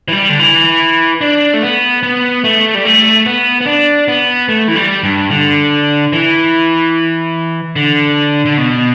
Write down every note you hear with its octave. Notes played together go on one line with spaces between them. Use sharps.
E3
G3
D3
E3
D4
A3
B3
B3
A3
G3
A3
B3
B3
D4
B3
A3
E3
G3
G2
D3
E3
D3
D3
B2